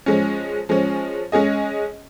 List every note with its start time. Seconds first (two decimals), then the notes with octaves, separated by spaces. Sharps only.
0.06 F3 G#3 C#4
0.69 F3 G#3 C#4
1.32 G#3 C#4 G#4 D#5